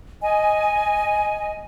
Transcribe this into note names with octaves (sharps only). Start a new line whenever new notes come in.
D#5 G#5